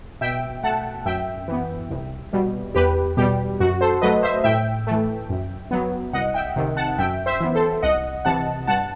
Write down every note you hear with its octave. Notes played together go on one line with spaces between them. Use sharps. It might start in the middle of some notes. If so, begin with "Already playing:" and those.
B2 E5 G5
A3 F#5 A5
F#2 E5 G5
E3 B3
C2
B2 G3
E2 G4 B4
B2 G3 G4
F#2 F#4
A4 C5
F#3 A3 B4 D#5
C5 E5
A2 E5 G5
E3 A3
F#2
F#3 B3
C2 D#5 F#5
E5 G5
C3 D#3
F#5 A5
F#2 E5 G5
C5 E5
E3 B3
A4 C5
C2 D#5 F#5
C3 E3 F#5 A5
G2 F#5 A5